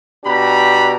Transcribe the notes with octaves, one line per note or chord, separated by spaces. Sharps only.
B2 D4 G4 A#5 B5